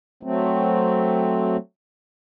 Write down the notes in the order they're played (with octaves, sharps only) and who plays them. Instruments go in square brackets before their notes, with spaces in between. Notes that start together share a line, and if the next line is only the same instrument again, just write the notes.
[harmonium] F#3 A3 C4